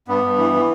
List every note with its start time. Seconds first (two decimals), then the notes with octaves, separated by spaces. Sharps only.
0.08 G2 B3
0.23 G2
0.38 E3
0.54 E3